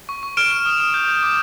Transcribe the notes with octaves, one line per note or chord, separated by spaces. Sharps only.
C#6
C#6
F6 D7 E7
F6
D#6
D#6
G6
G6
D6